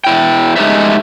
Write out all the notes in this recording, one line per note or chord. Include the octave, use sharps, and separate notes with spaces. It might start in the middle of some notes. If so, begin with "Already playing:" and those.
E2 E4 G5
G#3 A3 D#4 G4 C5 E5